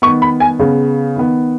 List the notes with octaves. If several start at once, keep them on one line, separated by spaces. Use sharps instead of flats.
D#3 B3 C#6
B5
G#5
C#3 B3
D#3 B3